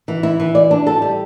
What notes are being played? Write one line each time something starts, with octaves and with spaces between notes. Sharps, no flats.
E3
E4
E3
D5
D4
A4
G3